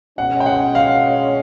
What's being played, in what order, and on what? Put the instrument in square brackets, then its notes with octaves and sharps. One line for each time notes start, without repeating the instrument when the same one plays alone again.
[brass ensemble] B2 G#3 C#4 [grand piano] F#5
[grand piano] G5
F#5
F5